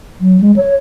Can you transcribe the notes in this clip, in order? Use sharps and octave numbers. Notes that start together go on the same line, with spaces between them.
F#3
G#3
C#5